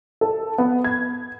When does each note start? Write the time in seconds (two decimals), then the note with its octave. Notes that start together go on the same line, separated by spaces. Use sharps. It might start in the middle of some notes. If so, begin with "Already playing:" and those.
0.21 A4
0.58 B3
0.84 G#6